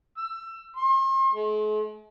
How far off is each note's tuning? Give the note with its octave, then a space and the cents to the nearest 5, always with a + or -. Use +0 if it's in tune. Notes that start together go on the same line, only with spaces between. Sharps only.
E6 +25
C6 +40
G#3 +45